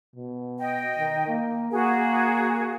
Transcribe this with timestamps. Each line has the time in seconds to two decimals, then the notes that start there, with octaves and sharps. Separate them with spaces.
0.16 B2
0.58 D#5 G5
0.99 D#3
1.28 A#3
1.72 A#3 F#4 G#4